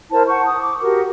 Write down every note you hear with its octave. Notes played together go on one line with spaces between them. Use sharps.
E4 A#4 C5 A5
C5 F#5 A5 C#6
D#6
D6
F#4 G4 A#4 F#5